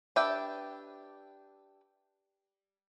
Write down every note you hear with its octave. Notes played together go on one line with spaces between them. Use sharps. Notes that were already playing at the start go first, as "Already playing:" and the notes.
D4 G4 B4 E5 G5